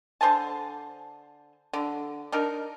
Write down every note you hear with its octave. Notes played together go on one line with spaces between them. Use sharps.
D3 C5 G#5 A5
D3
D4 D#4 A#4